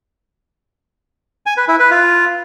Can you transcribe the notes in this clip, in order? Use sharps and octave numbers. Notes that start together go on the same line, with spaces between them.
G#5
B4
E4
B4
F4